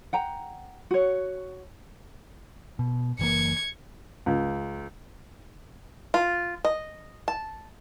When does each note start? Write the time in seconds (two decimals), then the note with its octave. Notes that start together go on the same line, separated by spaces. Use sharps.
0.13 F#5 G5 A#5
0.91 F#4 C#5
2.79 B2
3.19 F#1 E3 A#3 G#6 C#7
4.26 C#2
6.14 F4
6.65 D#5
7.28 A5